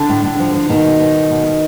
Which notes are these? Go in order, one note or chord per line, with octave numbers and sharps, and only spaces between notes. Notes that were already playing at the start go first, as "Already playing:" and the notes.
Already playing: D3 D4
A2
A2
F3
F3
B2 D#3 D#4
B2
B2
B2
B2
B2